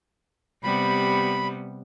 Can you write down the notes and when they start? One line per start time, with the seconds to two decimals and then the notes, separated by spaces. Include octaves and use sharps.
0.64 C3 G3 B3 B5